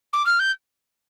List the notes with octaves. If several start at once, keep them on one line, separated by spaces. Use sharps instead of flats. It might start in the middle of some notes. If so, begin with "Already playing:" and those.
D6
F6
G6